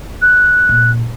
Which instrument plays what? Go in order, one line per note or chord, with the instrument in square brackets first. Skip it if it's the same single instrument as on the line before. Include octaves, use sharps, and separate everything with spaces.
[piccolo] F#6
[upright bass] A#2